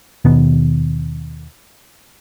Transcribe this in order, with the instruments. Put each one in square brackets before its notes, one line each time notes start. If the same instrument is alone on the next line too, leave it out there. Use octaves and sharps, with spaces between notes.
[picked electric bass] D#2 B2 D#3 B3